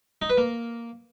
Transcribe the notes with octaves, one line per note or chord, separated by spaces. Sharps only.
D#4
B4
A#3